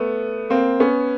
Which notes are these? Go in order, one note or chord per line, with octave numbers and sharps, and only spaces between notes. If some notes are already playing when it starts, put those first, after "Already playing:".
Already playing: A3 B3
A#3 C4
B3 C#4